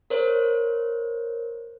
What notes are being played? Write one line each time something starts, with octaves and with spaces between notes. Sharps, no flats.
A#4 C5 C#5